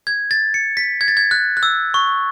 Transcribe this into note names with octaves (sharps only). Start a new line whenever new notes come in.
G#6
A6
C#7
B6
G#6
A6
G#6
F#6
F#6
E6
C#6